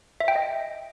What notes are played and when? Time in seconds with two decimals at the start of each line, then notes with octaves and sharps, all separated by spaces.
0.20 E5
0.28 G5
0.36 D#5